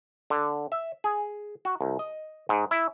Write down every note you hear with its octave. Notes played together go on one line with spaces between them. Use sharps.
D3
E5
G#4
F#4
C2
D#5
G#2
E4